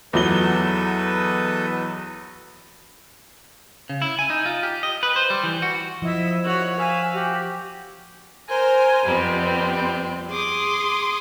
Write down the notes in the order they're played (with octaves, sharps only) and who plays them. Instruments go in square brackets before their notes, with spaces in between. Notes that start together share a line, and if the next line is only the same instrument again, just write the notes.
[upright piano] E2 F#3 G7 [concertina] A4 B4 D#5
[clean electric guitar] C#3
E4
G#5
D#4
F4
G4
D#5
B4
C5
G3
E3
F#4
[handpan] F3 [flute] E4 [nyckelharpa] D#5 E5
[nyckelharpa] F#4 C#5
[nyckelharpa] E5 F5 [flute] G#5
[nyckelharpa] F#4 [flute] G4
[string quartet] A#4 C5 G#5 A#5
F2 C3 G3 B3 C4
G#4 C6 D6 D#6